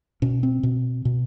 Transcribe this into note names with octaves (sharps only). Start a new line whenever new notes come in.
B2 C#4
C4
B2
B2